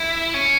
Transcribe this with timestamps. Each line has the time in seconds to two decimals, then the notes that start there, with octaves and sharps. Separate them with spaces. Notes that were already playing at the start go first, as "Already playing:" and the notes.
Already playing: E4
0.34 C#4